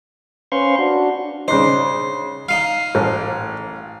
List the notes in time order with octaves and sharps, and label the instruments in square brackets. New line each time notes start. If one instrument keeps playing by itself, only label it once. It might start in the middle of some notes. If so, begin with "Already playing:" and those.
[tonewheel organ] C#4 B4 C5 F5 C6 C#6
D4 F#4
[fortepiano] C#3 D4 D#4 [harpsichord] C5
[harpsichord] D#4 F5
[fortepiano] A1